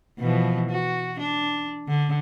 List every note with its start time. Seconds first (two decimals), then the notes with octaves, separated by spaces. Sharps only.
0.19 B2 E3 F3
0.70 F#4
1.20 D4
1.88 D3